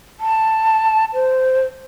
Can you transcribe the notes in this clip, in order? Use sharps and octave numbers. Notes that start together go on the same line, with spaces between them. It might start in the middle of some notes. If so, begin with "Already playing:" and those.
A5
C5